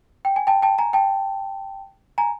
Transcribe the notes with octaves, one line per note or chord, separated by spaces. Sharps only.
G5
G#5
G5 A5
G5 A5
G#5 A#5
G5 A5
G#5 A#5